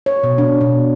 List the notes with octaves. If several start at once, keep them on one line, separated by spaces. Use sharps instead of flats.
C#5
B2
D4
B2